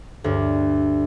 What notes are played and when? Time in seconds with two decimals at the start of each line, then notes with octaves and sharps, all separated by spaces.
0.24 D2 G2